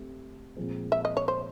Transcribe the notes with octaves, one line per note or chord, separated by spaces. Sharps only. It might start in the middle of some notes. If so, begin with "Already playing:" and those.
Already playing: A3 C4 G4
A#2 F3 G#3 C4
E5
D#5
C#5
C5